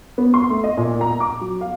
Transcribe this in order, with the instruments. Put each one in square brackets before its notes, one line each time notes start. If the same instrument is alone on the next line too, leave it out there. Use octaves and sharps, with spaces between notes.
[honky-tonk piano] B3
C6
A3
D#5
A#2
A#5
D6
F#3
F5